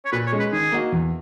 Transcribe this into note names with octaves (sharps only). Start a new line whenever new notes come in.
C#5
A#2 B4
C#5
G#3 C#4
B4
D#3 G#4
A#3 D#4 F#4
E2